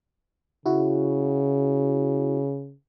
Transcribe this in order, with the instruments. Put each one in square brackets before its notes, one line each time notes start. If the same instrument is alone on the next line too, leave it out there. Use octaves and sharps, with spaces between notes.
[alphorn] C#3 [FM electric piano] E4 F#4